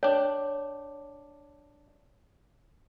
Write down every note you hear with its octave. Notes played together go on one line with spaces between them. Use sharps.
D4 C#5 G5